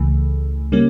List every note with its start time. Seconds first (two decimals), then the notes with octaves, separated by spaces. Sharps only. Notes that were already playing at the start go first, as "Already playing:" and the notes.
Already playing: C#2 C#3 E3 A3
0.72 C#3 G3 A#3 C#4